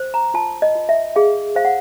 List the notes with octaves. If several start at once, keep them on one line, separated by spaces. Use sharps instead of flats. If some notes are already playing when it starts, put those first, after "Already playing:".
Already playing: C5
A#5
F4 A5
D#5
F4
E5
G#4 F5
C5 F5
F#5